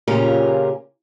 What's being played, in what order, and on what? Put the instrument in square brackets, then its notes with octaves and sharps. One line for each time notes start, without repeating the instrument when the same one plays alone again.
[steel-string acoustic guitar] A#2 C#3 C#4 F4 G4 A#4